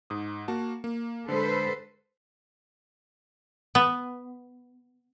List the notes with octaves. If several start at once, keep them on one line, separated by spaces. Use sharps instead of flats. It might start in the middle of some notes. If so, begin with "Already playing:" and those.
G#2 D#6
A#3 F#4 A5
A#3
D3 G#3 A4 B4 C5
B3